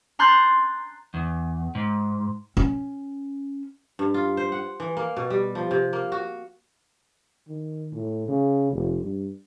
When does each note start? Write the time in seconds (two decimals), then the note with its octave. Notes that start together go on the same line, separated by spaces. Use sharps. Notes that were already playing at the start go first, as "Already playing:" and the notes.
0.19 A#5 C6 F#6 G6 A6
1.14 E2
1.75 G#2
2.57 C#4
3.99 G2
4.14 F4
4.37 C5
4.52 F#5
4.80 E3
4.97 A#3
5.17 B2
5.30 G3
5.55 F3
5.71 C3
5.93 A#3
6.12 F#4
7.48 D#3
7.93 A2
8.28 C#3
8.72 F1
9.01 G2